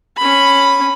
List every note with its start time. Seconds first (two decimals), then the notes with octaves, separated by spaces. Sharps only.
0.17 C#4 B5